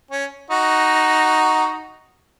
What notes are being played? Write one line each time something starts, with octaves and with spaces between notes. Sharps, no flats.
C#4
D#4 F#4